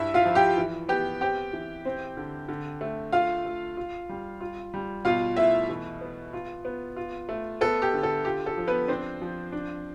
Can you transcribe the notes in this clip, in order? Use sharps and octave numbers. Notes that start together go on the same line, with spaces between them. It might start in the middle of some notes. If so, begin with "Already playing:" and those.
Already playing: G2 E4 E5
F4 F5
F3
G4 G5
E3
B3 G4 G5
C4 G4 G5
E3
C4
D3
D3
A3
F4 F5
A3
F4
G3
F4
G3
B2 F4 F5
A3 E4 E5
E3
B3
F4
B3
F4
A3
B3 A4
G4
D3
A4
F4 G4
A4
F3
B3 B4
C4 D4 C5
F3
D4